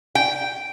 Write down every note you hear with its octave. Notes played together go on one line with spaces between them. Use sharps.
G5